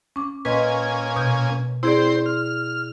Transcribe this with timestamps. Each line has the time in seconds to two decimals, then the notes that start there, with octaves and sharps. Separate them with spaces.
0.16 C#4 D6
0.45 A#2 C#4 B4 D#5 G#5 C6
1.16 B2 G6
1.83 C4 E4 G#4 C5 D5
2.26 F6